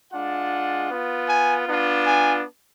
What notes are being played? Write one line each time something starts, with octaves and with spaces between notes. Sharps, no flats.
G#3 D4 F4 F#5
B3 F4
G#5
B3 D4 F4
G#5